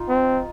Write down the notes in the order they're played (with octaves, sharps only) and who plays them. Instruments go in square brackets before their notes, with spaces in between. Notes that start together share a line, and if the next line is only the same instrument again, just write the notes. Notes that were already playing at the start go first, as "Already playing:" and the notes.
Already playing: [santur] D#4 F4
[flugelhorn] C4